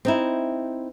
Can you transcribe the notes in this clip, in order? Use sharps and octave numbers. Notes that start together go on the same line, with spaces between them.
C4 D#4 E4